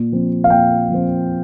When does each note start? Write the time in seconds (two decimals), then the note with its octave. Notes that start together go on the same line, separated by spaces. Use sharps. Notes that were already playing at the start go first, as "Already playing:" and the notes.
Already playing: A#2
0.12 F3 C4
0.44 F5
0.50 A#2 G5
0.89 F3
0.94 C4